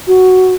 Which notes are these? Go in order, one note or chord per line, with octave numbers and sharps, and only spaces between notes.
F#4